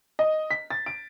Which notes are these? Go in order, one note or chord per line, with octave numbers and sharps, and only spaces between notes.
D#5
B6
A6
D7